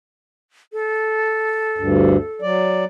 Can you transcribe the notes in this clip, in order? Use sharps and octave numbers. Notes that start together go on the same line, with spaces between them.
A4
D2 G2
F#3 D5